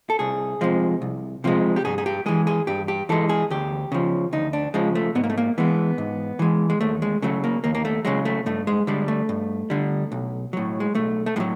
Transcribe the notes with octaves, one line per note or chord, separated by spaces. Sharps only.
A4
C2 G#4
C3 F3 G#3
C2
C3 F3 G#3
G4
G2 G#4
G#4
G4
E3 G#3 G#4
G#4
G2 G4
G4
E3 G#3 A4
G#4
D2 G4
C#3 F3
D2 D#4
D4
C#3 F3 G#3
A3
G#2 B3
A#3
A3
A#3
E3 G#3 B3
G#2
E3 G#3
G#3
D#2 A3
G#3
C#3 F#3 A3
A#3
D#2 A#3
A#3
A3
C#3 F#3 G#3
A3
G2 A3
G#3
D3 G3 G#3
A3
G2
D3 G3
B1
A2 F#3
G#3
B1 A3
A3
A2 F#3 G#3